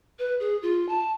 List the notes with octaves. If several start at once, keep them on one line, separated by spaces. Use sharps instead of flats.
B4
G#4
F4
A5